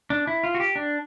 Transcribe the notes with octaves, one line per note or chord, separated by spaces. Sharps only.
D4
E4
F4
F#4
G4
D4